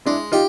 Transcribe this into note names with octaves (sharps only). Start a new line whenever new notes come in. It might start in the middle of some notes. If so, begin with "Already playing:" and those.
G#3 D4 E4
D#4 F4 G4